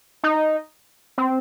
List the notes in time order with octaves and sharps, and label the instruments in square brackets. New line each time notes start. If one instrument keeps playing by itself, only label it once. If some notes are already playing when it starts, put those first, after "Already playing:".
[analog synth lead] D#4
C4